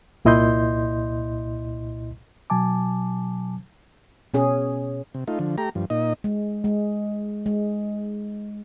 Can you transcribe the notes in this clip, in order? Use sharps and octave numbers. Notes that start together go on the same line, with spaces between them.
C2 A#2 E4 D#5 C6 G6
B2 F#3 G#5 A5 D6
B2 C#4 G#4
C3
A3 D#4 F4
D3 F3
A3 G4 A#5
G2 F3
A#2 D#4 D#5
G#3
G#3
G#3